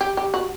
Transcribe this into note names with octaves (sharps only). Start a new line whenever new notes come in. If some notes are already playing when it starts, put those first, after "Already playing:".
G4
G4
F#4